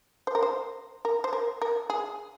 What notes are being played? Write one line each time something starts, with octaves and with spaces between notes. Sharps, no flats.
C5
A#4
C5
A#4
C5
A#4
A#4
G#4